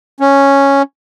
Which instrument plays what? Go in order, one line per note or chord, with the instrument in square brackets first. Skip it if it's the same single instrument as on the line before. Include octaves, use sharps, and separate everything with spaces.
[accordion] C#4